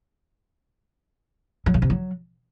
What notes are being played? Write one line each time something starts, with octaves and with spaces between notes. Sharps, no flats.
F#3
C#3
C3
F#3